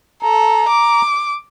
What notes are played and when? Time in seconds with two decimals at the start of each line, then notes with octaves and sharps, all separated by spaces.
0.23 A4 A#5
0.68 D6